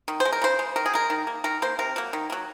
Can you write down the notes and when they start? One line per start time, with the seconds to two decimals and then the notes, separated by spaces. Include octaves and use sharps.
0.08 D#3
0.20 C5
0.25 G#3
0.32 A#4
0.42 C#3 C5
0.59 G#3
0.76 D#3 A#4
0.86 G#4
0.93 G#3 A#4
1.10 D#3
1.27 A#3
1.44 D#3 A#4
1.62 A#3 C5
1.79 C3 A#4
1.96 F#3 A#3
2.13 D#3
2.30 F#3 A#3